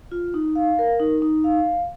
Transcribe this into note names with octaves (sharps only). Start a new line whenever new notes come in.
F4
D#4
F5
A#4
D#4
D#4
F5